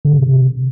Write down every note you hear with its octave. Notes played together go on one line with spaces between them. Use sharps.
D3
C#3
C3